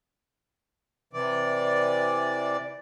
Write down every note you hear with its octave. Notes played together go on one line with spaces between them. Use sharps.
C3 E3 D5